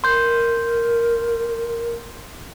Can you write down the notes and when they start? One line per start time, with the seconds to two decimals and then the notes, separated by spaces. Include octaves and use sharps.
0.04 A#4 C6 G6